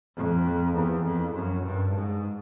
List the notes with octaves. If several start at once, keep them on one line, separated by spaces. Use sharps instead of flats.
F2
E2
F2
F#2
G2
G#2